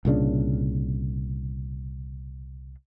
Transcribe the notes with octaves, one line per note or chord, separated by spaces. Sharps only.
C2 A#2 C#3 D4